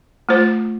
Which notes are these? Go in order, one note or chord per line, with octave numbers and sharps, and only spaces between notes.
A3 F4 C5